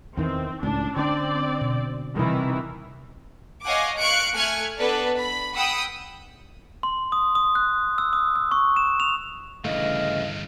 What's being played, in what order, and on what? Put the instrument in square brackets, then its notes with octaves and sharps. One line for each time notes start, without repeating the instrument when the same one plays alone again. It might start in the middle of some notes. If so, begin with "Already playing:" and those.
[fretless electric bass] E2 D#3 E3 [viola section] C4
[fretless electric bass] C#2 A2 [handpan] C#4 [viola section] D4
[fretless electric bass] D3 D4 [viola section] C4 D5
[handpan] B2
[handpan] C3 G3 [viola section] D#3 E3 E4
[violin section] C#5 D#5 F5 F#5 G#5 D6
F5 C#6 F#6 C#7 D7
A3 G#5 F6 F#6 G#6 C#7
B3 D4 A4 B4 D5
B5
F#5 G5 B5 D#6 E6
[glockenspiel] C6
D#6
D#6
F#6
E6
D#6
E6
C#6
E7
F7
[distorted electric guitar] D2 G2 [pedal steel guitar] C#3 E3 A3 [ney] D#5 [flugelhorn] F5